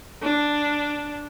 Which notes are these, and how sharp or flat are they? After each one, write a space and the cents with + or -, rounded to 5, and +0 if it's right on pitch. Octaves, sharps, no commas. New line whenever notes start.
D4 +0